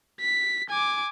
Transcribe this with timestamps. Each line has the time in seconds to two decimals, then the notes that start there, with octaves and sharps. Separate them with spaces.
0.21 B6
0.69 G#5 D6